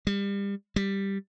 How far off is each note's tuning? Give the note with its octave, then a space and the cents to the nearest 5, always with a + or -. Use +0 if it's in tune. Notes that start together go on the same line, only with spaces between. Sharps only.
G3 +30
G3 +5